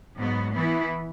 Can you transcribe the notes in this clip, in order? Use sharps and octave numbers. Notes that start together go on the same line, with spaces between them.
G#2 F#3 B3
E3 B3 E4